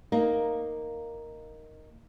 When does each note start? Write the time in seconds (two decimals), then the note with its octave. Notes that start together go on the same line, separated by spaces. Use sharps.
0.12 A#3 D#4